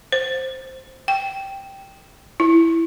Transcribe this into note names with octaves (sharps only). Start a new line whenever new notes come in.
C5
G5
E4